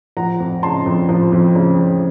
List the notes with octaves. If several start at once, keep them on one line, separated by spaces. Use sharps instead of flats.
F3 F#5 A#5
F2
C#3 A5 C6
F2
F3
F2
C#3
F2